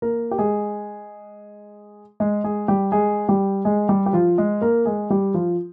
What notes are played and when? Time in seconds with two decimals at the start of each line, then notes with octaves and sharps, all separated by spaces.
0.02 A#3 A#4
0.31 G4
0.38 G#3 G#4
2.20 G#3 G#4
2.44 G#3 G#4
2.68 G3 G4
2.92 G#3 G#4
3.29 G3 G4
3.65 G#3 G#4
3.89 G3 G4
4.06 G4
4.13 F3 F4
4.38 G#3 G#4
4.61 A#3 A#4
4.85 G#3 G#4
5.10 G3 G4
5.34 F3 F4